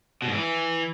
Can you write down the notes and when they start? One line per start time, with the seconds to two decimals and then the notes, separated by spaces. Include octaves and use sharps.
0.22 B2
0.28 G#2
0.34 E3